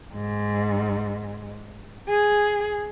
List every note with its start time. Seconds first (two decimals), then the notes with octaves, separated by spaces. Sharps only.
0.13 G#2
2.08 G#4